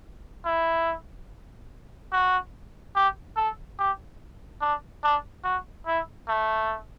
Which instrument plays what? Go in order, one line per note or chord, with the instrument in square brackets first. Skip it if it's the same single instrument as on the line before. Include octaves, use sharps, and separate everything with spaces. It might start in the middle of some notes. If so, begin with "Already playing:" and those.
[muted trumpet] E4
F#4
G4
A4
G4
D4
D4
F#4
E4
A3